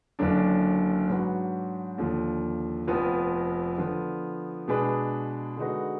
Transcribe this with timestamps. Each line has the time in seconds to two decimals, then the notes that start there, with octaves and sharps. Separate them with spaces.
0.19 F#1 F#2 D3 F#3 D4
1.08 G#2 F#3 D4 F#4 B4
1.98 D#2 D3 F3
2.88 F1 F2 F3 B3
3.78 D3 F3 B3
4.68 B2 G#3 D4 G#4 B4
5.57 D3 G#3 D#4 F#4 B4